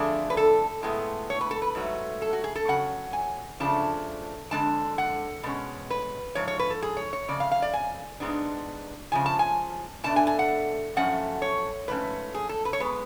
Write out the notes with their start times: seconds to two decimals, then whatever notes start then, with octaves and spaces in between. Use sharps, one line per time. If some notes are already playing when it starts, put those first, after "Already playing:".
Already playing: F2 D3 F3 A3 D4 G#4
0.30 B4
0.37 A4
0.83 A2 G#3 B3
1.30 C#5
1.41 B4
1.51 A4
1.62 B4
1.75 G#2 F#3 A3
2.22 A4
2.33 F#4
2.44 G#4
2.56 A4
2.68 C#3 F#3 C#4 F#5
3.13 G#5
3.60 C#3 F3 A3 D4 A5
4.51 F2 D3 G#3 D4 A5
4.98 F#5
5.43 B2 G#3 C#4
5.90 B4
6.35 G#2 F3 C#5
6.48 C#5
6.59 B4
6.70 A4
6.82 G#4
6.97 C#5
7.13 C#5
7.28 F2 C#3 D5
7.40 F5
7.52 F5
7.62 D5
7.74 G#5
8.20 G#2 G#3 B3 D4
9.12 C#3 F3 G#3 G#5
9.26 A5
9.39 G#5
10.04 B2 A3 D4 A5
10.16 G#5
10.27 G#5
10.39 F#5
10.96 F#2 F3 A3 C#4 F#5
11.42 C#5
11.88 G#2 F3 A3 C#4 B4
12.34 G#4
12.49 A4
12.65 B4
12.73 C#5
12.80 G#3 B3 B4